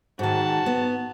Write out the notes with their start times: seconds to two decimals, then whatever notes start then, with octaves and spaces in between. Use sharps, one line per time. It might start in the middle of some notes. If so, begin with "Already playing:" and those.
0.19 G#2 D#3 F#4 A5
0.66 B3